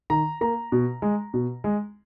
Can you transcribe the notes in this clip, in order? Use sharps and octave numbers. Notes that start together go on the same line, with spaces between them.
D#3 A#5
A#3 A#5
B2
G#3
B2
G#3